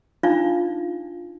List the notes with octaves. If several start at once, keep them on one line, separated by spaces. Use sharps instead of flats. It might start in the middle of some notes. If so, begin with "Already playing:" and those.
D4 D#4 F4 F5